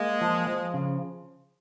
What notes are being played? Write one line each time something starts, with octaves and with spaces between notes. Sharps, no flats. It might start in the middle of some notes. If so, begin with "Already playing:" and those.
Already playing: G#3 A#3
F3
F3
C#3